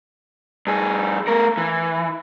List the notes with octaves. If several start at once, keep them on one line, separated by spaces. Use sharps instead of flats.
G2 G#4
A3 A#4
E3